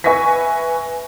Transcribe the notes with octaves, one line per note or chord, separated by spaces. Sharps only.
B4 E5 G#5 C#6 A#6 B6